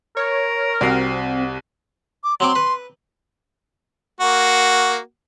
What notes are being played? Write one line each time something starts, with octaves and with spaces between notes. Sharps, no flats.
A#4 C#5
C2 C4 F#4 C7
D6
F#3 C4 C6 D6
B4
A#3 F#4